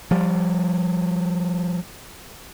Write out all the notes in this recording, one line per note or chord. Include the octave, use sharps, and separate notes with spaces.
F3 G3